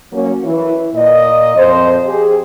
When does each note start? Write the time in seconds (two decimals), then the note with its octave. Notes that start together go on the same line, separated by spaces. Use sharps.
0.13 F#3 A#3 C#4 F#4
0.44 E3
0.95 A#2 D#5
1.56 F2 C5
2.06 G4 G#4